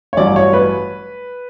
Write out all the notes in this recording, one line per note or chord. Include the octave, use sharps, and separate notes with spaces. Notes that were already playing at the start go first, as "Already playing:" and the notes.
C#5
A1 G2 F#3 D5
C#5
B4